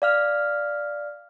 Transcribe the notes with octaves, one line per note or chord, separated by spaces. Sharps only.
D5 F5 F6